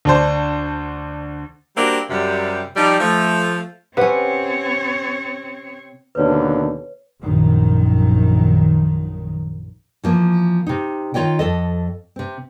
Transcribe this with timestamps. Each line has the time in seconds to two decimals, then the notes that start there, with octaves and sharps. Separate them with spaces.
0.05 D2 D4 C5
1.77 G3 A#3 C4 D4 F#4 G4
2.10 F#2 C3 G3
2.76 F3 G3 D#4
3.00 F3 A3
3.97 C3 C4 C#4 B4 C#5 F#5
6.15 D#2 B2 D3 B4 C#5
7.23 A#1 F#2 D#3
10.04 E3 F3 A#3
10.67 C3 D#4
11.14 D#3 F4 C#5 D#5 G5
11.39 F2 A4 D#5
12.16 C3 C4